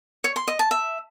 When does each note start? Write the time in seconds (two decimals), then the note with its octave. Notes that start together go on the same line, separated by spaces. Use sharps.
0.24 C#5
0.36 C6
0.48 D#5
0.59 A5
0.71 E5